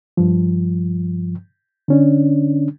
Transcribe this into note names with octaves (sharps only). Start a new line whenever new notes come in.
G2 F3
D3 C#4 D4